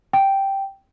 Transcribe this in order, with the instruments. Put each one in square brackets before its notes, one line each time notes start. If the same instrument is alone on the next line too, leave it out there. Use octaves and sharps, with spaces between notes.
[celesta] G5